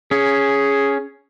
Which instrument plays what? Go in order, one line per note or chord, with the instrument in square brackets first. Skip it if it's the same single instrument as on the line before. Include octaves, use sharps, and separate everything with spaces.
[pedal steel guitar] C#4 [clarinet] G#4